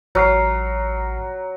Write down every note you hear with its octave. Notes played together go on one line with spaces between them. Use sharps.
A1 F#3 F6 C7